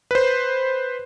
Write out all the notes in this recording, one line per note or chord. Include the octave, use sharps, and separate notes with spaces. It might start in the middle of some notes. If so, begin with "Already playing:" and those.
B4 C5